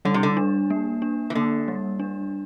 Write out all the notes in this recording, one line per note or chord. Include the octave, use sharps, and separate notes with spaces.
D3 G3
C3
D3
D4
A#3
D4
E3
D3 A#3
G3
D4